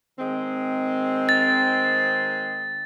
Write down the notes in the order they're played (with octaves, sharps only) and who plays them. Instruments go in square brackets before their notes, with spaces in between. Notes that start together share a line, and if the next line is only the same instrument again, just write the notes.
[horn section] D#3 G#3 C4
[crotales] A6